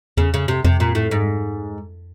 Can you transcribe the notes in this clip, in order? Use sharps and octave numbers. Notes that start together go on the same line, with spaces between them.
E2 C#3
C#3
F2
C3
F2 C3
A#2
A2
G#2